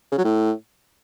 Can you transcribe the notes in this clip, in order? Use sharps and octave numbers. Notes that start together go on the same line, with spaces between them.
C#3
F#3
A2